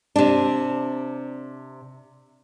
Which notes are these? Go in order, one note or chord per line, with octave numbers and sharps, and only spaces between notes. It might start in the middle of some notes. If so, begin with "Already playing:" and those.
C3 D4